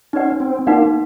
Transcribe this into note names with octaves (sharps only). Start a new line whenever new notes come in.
C#4 D#4 F#4 B4 D5 F#5
C4
A#3 D#4 F#4 B4 D5 F#5